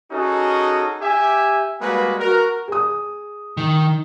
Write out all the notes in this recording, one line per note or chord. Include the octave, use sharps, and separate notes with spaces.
C#4 D#4 F#4 G#4 A4 D#5
G4 E5 G#5
G3 G#3 A#3 F#4 B4
F#4 A#4
G#4 D#6
D#3